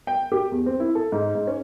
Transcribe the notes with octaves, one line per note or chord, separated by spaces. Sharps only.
G5
G4
E2
C4
E4
A4
G#2
G#2
C#4